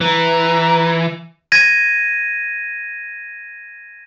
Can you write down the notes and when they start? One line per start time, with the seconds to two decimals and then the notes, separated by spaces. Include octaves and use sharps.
0.01 E3 A#5
1.52 G#6 A#6 D#7